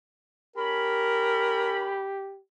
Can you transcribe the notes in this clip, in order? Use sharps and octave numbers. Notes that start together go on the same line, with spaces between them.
C#4 G4 A#4 B5